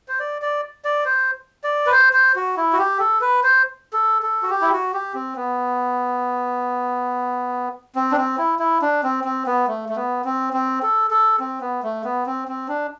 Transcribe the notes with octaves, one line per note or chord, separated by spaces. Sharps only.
C5
D5
D5
D5
C5
D5
B4
C5
C5
F#4
E4
F#4
G4
A4
B4
C5
A4
A4
F#4
G4
E4
F#4
G4
C4
B3
C4
D4
C4
E4
E4
D4
C4
C4
B3
A3
A3
B3
C4
C4
A4
A4
C4
B3
A3
B3
C4
C4
D4